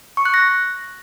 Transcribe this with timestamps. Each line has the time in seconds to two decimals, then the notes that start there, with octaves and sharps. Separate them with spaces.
0.17 C#6
0.25 F#6
0.34 A#6